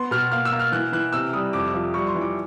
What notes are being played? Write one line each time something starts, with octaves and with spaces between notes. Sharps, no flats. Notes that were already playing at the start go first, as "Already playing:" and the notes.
Already playing: B3 C6
B2 F6
A#3 F6
E6
A#3
F6
E3 F#6
E3 F#6
C3 E6
G3 D#6
F2 D6
F3
G3 C#6
C6
E3
D6